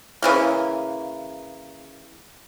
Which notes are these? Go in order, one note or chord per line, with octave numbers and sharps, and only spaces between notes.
C#3 E3 A#3